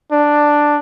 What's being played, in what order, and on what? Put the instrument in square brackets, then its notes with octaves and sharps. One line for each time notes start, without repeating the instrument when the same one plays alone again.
[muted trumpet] D4